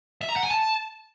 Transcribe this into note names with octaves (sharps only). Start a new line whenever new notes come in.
E5
A#5
F#5
G#5
A5